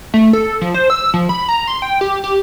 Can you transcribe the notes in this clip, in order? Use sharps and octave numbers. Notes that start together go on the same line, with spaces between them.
A3
A4
F3
C5
E6
F3
B5
A#5
C6
G5
G4
G4